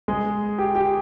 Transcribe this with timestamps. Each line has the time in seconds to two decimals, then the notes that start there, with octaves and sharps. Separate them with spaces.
0.08 G#3 G#4
0.58 G4
0.75 G4